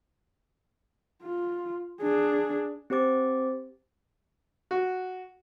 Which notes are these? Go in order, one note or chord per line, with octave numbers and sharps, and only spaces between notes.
F4
D4 G#4
C4 G4 C5 D6 A6
F#4